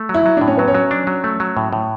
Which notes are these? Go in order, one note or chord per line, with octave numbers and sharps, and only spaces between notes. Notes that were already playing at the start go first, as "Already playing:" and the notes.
Already playing: A3
F#3
E4
F#3
A2 D4
C#4
F#3 B3
C#4
F#3
D4
F#3
A3
F#3
A2
A2